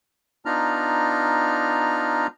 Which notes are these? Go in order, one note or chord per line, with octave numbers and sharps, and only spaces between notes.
B3 D4 D#4 F4 A#5 F6